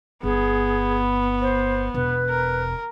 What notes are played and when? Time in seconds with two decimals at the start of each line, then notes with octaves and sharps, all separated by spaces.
0.23 G1 B3 G#4
1.41 C5
1.94 E1 B4
2.29 A#4